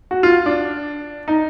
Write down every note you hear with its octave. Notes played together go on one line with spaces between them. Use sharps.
F#4
F4
D4
D#4